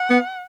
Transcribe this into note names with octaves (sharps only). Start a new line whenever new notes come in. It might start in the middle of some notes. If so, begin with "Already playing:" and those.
Already playing: F#5
B3